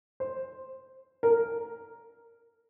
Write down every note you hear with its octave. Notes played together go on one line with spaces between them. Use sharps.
C5
A#4